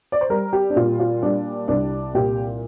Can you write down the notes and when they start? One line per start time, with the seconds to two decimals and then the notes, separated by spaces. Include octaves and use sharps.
0.12 D5
0.21 C5
0.30 G3 A#4
0.53 G4
0.70 D4
0.76 A#2 F4
1.00 F4
1.22 G3 D4
1.68 C2 D4
2.15 A#2 G4